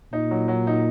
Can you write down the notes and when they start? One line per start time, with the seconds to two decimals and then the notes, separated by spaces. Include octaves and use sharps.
0.13 A#2 D#4
0.31 F#3
0.48 F#3
0.67 D#4